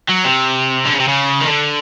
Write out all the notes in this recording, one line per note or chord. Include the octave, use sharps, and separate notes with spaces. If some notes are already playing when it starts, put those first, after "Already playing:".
F#3
C3
D3
C#3
C3
C#3
D#3
D3